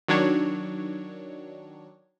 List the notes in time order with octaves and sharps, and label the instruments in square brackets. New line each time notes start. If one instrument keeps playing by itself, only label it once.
[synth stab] D#3 F#3 D4 C#5